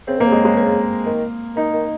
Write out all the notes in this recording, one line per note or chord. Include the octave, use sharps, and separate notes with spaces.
C#3 C4
D#3 A#3
C#3
G#3
G#3
A#3
D#3
D#3 D#4
D#3